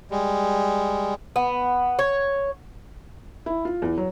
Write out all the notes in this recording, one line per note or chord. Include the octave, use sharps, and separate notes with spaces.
G3 G#3
B3
C#5
E4
F4
E2
F#3